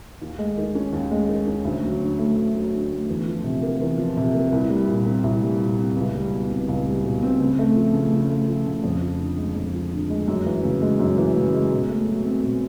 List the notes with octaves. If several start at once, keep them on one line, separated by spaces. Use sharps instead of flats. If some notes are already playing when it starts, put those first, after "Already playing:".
D#2
G#3
D#3
C#4
D#2
G#3
D#3
C#4
D2
F#3
D3
A3
D2
F#3
D3
A3
E2
F3
C3
A#3
E2
F3
C3
A#3
C2
G3
A#2
C4
C2
G3
A#2
C4
C#2
G3
B2
C4
C#2
G3
B2
C4
C#3
A3
F3
C#3
C#3
A3
F3
C#3
F2
F3
D3
G#3
F2
F3
D3
G#3
F#2
E3
C#3
G#3
F#2
E3
C#3
G#3
B2
A3
F#3
C4
B2